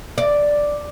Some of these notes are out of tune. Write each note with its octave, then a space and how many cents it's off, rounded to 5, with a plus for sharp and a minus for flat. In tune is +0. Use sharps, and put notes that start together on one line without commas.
D5 +0